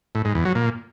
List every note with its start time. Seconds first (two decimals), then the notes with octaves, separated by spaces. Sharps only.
0.15 A2
0.25 G#2
0.35 E2
0.45 F#3
0.55 A#2